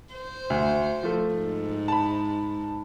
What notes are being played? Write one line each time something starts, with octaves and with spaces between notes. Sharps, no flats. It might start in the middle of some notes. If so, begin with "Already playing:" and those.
C5
D2
F3 A3
G#2
A5 B5